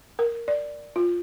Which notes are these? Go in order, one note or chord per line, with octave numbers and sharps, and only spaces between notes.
A#4
D5
F4